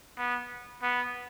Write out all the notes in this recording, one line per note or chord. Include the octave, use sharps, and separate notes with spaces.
B3
B3